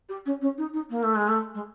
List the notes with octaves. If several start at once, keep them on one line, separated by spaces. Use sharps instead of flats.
G4
C#4
C#4
D#4
D#4
A#3
A3
G#3
A3
G#3